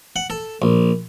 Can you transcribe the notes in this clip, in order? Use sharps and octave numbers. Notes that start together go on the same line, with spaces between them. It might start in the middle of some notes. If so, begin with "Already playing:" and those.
F#5
A4
A#1